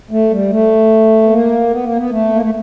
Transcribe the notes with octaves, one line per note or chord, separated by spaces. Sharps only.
A3
G3
A3
B3
A#3
B3
A#3
B3
A3
A#3
A3